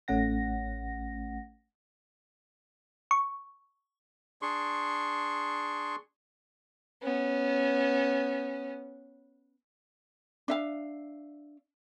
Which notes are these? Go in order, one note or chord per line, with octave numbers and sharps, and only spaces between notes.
A1 A3 C#4 F#5 A#6
C#6
D4 G#4 C6 C#6
B3 C#4
D4 E5 F5